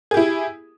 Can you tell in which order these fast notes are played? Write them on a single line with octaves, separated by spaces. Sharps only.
G#4 G4 E4